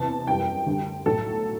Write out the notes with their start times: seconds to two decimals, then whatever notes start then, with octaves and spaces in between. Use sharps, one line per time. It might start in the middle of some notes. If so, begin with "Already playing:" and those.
Already playing: E2 C3 E3 A5
0.27 F#2 E3 G3 G5
0.66 D2 D3 G3
1.06 B1 A2 F#3 A4